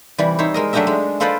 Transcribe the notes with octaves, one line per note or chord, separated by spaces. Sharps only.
C3 E3 G3
D#4 C5 C#5 E5
G#3 A#4 D#5
F#3 A3 D4 G4 D#5 E5
G#3
F4 A4 B4 C5 D5 D#5